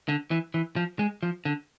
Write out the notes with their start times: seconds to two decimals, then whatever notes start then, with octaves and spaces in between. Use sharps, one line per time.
0.08 D3
0.31 E3
0.54 E3
0.76 F3
0.99 G#3
1.23 F3
1.45 D3